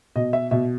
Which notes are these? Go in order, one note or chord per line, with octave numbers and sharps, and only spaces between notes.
B2 D#5
E5
B2 E5